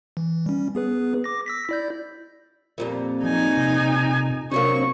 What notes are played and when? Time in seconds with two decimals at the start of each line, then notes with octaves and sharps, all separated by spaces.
0.17 E3
0.46 G3 C#4
0.75 B3 G#4 B4
1.24 D6 A#6
1.46 E6 A#6 B6
1.69 E4 D5 G6
2.78 F2 A#2 G3
3.23 F3 D#4 G#5
3.57 C3
4.52 C3 F#3 A#3 C4 D4 C#6